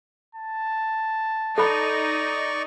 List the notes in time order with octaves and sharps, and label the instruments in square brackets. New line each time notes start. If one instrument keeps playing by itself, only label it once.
[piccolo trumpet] A5
[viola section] D#4 [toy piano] A4 B5 [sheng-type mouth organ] D5 C#6